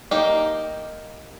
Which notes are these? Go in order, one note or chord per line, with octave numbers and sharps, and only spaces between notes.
A#3 D#4 G4